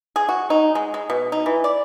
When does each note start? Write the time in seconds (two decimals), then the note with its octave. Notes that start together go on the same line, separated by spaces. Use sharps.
0.16 G#4
0.29 F#4
0.50 D#4
0.75 G#3
0.94 G#3
1.10 B2
1.32 D#4
1.46 E3
1.64 D5